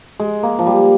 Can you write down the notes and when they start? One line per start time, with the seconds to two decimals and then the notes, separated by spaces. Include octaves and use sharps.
0.20 G#3
0.43 A#3
0.59 F3
0.67 G3